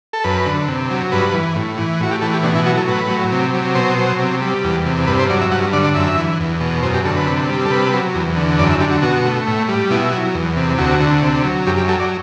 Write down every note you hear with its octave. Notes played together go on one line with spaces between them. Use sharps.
A4
F#2 B4
D3
C3
F#3
G2 B4
E3
A2
E3
A2 F#4
G4
E3 A4
G4
B2 D4
E4
F#3 F#4
A4
A2 B4
F#3
C3
F#3
B2 C5
F#3
C3
G3
E2
C3
G2 B4
C5
F#3 D5
E5
G2 F#5
D3 D5
D5
F#2 E5
E3
E2
B2
F#2 C5
G4
D3 A4
B4
C3
G3
A4
C3 B4
F#3
E2
D3
F#2 D5
E5
D3 G4
F#4
B2 F#4
A3
A2
G3
B2 E4
F#3
E2
C3
D2 F#4
D3
C3
F#3
F#2 G4
G4
F#3 A4
D5